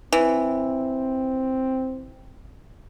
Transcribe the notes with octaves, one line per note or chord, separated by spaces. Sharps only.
E3 C4